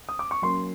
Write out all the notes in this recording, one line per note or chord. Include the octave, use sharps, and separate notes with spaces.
D#6
D6
C#6
F#3 A#3 C#4 C6